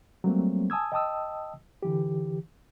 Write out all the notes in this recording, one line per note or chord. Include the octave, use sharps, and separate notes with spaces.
F#3 G3 A3 A#3 C4
G#5 A5 D#6 E6 G#6
D#5 G5 A5 D#6 E6
D3 E3 G4